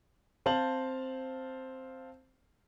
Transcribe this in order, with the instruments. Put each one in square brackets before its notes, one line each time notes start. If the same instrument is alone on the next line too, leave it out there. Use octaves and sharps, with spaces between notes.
[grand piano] C4 C5 F5 A5 F#7